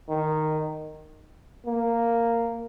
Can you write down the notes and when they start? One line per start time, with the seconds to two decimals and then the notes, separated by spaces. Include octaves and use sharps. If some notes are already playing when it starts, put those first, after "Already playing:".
0.09 D#3
1.66 A#3